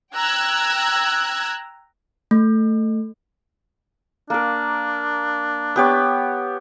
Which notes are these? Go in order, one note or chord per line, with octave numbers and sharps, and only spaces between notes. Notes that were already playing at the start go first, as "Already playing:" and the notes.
G5 A#5 E6 F#6 G#6
A3
A#3 D4 A#4
B3 G4 C#5